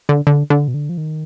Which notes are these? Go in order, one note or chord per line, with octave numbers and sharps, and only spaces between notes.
D3
D3
D3
B2
D3
F3
D#3